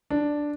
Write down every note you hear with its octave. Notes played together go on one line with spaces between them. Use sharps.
D4